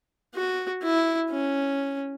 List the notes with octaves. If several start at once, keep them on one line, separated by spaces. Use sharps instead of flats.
F#4
E4
C#4